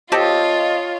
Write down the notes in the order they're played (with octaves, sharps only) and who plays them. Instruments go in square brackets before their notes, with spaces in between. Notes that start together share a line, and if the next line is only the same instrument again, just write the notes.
[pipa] C4 G4 A4 [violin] F4 C#5 [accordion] D#5